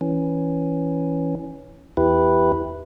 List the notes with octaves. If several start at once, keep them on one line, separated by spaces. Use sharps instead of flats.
E3 C#4
E2 E4 G4 B4